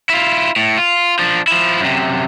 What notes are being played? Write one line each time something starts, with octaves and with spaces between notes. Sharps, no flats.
E4 F4
A2
F4
F3 D4
F3 E4
F#2 C3